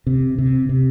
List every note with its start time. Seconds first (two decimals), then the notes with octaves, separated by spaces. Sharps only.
0.07 C3
0.38 C3
0.69 C3